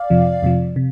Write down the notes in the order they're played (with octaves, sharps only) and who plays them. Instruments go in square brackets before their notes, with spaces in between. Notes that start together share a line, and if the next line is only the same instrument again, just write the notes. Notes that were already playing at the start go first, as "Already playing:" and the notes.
Already playing: [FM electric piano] D5 F5
F2 C3 F3
F2 C3 F3
C3